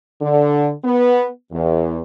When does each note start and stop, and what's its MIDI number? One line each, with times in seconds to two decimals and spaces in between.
0.21 0.72 50
0.84 1.28 59
1.53 2.01 40